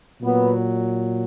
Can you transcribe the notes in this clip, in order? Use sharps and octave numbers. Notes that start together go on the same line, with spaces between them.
A#2 F#3 B3